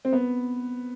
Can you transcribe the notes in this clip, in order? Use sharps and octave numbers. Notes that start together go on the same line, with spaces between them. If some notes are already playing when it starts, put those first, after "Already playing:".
C4
B3